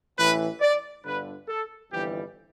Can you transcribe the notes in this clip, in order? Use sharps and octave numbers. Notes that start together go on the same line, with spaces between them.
A1 A2 E3 B4
D5
G1 G2 D3 B4
A4
G1 F2 E3 G3 G4